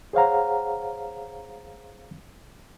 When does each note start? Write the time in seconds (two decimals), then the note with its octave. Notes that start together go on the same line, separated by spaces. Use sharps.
0.13 G#4 C5 C#5 F5 F#5 A#5